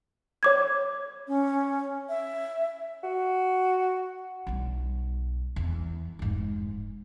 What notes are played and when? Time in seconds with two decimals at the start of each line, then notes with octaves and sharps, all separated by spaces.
0.43 C#5 D6 G#6
1.28 C#4
2.09 E5
3.03 F#4
4.47 B1 G3
5.56 E2
6.19 F1 G#2